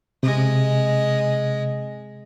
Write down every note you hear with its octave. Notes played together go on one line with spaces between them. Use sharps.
C3 G#3 D#5